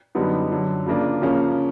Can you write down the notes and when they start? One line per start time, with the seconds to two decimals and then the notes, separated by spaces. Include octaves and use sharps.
0.15 F#2 D3 G3 B3 D#4
0.51 F#2 D3 F#3
0.86 C#3 F3 A#3 D4 F4
1.22 C#3 F3 A#3 C#4